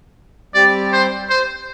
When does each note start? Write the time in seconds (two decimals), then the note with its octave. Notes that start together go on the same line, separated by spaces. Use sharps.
0.54 G3 C4 G4 D5
0.93 C5
1.29 C5